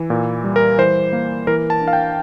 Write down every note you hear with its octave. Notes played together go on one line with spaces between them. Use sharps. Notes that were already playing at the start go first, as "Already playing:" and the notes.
Already playing: E3
A#2
G3
A#4
E3 C5
A#3
E3 A#4
A5
D4
F5
G5